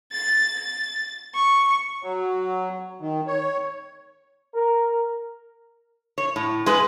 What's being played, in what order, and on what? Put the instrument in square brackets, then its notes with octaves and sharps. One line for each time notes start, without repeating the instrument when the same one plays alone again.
[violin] A6
A6
C#6
[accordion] F#3
D#3
C#5
[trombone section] A#4
[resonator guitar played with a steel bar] C#5
A2
G#3 B4